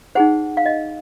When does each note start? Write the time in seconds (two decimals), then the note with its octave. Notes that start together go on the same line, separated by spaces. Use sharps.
0.15 D#4 G#4 C5 F#5
0.57 F5
0.66 D#5